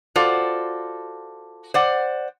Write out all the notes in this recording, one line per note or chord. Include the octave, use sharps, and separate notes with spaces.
F4 F#4 A4 C5 D5
C5 D5 F#5